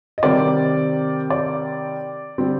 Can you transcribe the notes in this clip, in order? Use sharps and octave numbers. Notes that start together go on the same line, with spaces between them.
D#5
C3 D#3 G3 C4 D5
D5
D3 G3 C4